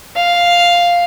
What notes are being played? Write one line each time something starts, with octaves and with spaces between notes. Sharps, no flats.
F5